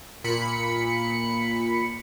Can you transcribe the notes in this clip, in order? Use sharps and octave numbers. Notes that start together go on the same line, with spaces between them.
A#2 B5 C#7